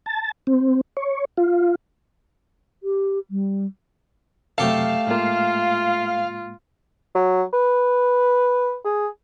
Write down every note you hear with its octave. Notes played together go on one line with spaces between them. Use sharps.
A5
C4
C#5
F4
G4
G3
F#2 C3 F#3 A3 G4 A4 F5
A2 G#3 A#3 F4
F#3
B4
G#4